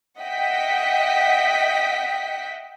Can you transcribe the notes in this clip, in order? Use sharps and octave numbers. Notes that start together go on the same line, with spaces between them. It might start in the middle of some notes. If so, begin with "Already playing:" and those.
D#5 E5 F#5 G5 B6